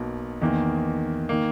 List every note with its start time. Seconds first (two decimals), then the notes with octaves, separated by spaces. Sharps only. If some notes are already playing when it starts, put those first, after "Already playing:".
Already playing: B1 B2 A#3
0.41 E2 D#3 A#3
1.29 D#3 A#3